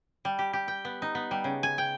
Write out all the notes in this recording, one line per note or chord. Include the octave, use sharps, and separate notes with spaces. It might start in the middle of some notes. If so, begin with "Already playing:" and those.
G3
G4
G4
G5
B3
D#4
B3
G3
C#3
G#5
G5